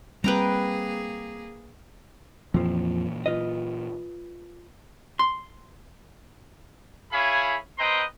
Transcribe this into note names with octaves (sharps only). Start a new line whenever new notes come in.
G3 A#3 C4 G#4 B4 G5 A#5
F2 A#2 E3 F3 A#3
F4 B4 D#5
C6
E4 G#4 C#5 F5 B5
C4 B4 D#5 G5 A#5 C6